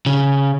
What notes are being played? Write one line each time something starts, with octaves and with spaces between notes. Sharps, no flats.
C#3